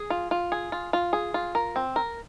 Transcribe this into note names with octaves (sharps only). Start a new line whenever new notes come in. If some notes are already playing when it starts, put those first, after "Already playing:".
Already playing: G#4
F4
F4
G#4
F4
F4
G#4
F4
A#4
C4
A#4